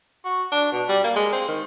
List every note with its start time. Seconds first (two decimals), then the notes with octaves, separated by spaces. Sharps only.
0.25 F#4
0.52 D4
0.72 B2
0.89 G3
1.04 A#3
1.16 G#3
1.33 C4
1.48 D#3